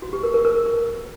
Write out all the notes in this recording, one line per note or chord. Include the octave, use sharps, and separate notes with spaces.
F#4
G4
A#4
A#4
A#4